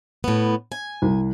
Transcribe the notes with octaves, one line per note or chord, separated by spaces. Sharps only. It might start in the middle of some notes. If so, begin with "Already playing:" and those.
A2 B3
G#5
C2